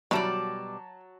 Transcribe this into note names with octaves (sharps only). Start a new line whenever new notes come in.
B2 F#3 G3 A#4 C#5 D5 E5 A5